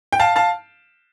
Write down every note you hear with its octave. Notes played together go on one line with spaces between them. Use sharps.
G5
F5 A5
F5 A5